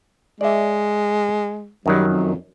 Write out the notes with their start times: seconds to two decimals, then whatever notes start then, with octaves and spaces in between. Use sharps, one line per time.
0.41 G#3 D5 E5
1.86 F#2 D#3 F#3 G3
2.08 F2